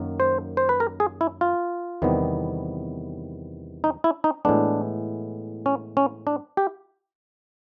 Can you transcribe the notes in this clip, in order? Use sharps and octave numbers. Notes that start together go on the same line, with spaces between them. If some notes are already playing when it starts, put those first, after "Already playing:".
Already playing: F#2 D#3 F#3 A#3
C5
C5
B4
A#4
G#4
E4
F4
E2 C3 D#3 G3 B3
D#4
E4
D#4
A2 E3 G#3 B3 D4
C#4
C#4
D4
G4